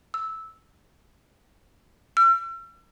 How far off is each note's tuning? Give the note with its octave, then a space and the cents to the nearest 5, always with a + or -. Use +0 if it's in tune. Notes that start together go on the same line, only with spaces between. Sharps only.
E6 -10
E6 +45